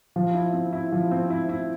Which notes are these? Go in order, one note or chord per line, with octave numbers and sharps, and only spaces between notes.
F3
E4
C4
E4
F3
C4
E4
E4